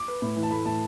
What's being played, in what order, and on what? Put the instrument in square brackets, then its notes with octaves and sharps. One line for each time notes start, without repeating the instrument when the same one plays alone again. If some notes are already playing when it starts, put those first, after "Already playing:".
Already playing: [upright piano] D6
[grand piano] B4
A2
E3
[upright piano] A5
[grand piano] A3 [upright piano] B5
[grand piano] A2 [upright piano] A5